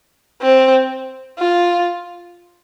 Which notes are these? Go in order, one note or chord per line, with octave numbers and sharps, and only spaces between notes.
C4
F4